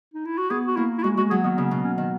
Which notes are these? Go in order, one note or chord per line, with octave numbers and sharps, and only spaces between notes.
D#4
E4
F#4
B3 G#4
F#4
A#3 E4
E4
G#3 F#4
G#3 F#4
F#3 G#4
D#3 B3
C#3 B3
B2
C#4
D#3